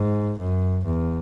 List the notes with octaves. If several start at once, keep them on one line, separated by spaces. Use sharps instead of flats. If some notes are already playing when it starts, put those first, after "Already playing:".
Already playing: G#2
F#2
E2